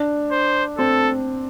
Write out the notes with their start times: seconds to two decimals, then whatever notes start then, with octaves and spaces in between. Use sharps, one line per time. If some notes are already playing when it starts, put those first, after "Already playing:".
Already playing: D4
0.31 C5
0.78 C4 A4